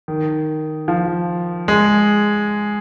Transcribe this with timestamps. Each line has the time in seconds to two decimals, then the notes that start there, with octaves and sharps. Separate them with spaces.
0.08 D#3
0.88 F3
1.68 G#3